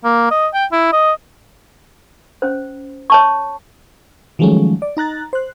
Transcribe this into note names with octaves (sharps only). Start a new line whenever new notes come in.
A#3
D#5
G5
E4
D#5
C#4 C5
C#5 A5 C#6
D#3 F3 F#3 G#3 A3 C#4
D5
D#4 A#5 F#6 A6
C5 F#6